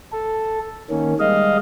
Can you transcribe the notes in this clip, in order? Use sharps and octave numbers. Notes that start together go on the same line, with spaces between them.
A4
D#3 A#3 C#4
G3 G#3 D#5 F5